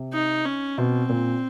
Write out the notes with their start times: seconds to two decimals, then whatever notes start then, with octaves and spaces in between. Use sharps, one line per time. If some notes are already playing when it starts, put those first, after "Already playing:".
Already playing: C3
0.13 D#4
0.45 C#4
0.77 B2 C4
1.09 A#2